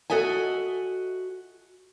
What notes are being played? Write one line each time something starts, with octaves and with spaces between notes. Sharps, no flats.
F#4 A4 D#5 E5 G#5